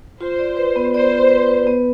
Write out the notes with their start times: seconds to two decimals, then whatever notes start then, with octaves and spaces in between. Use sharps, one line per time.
0.21 F4 C5
0.39 D5
0.57 B4
0.76 B3
0.94 C5 D5
1.12 F4
1.31 B4
1.48 B4
1.67 B3